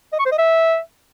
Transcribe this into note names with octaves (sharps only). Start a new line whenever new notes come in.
D#5
C#6
C5
D#5
E5